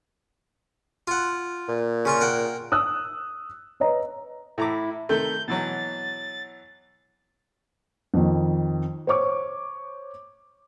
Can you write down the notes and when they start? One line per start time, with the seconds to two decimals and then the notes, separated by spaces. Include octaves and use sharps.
1.08 F4 F#5
1.68 A#2
2.05 C#3 F4 C#6
2.21 A#4 F#5 G5
2.72 D#6 E6 F#6
3.80 B4 C#5 D#5 A#5
4.58 A2 E4 A#5 D6
5.09 C3 D#3 A3 G6
5.48 B2 E3 F#3 A6
8.14 F2 D#3
9.07 C5 C#5 C#6 D6